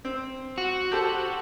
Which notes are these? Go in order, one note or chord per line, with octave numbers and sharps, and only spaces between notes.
C4
F#4
G4 A4 C5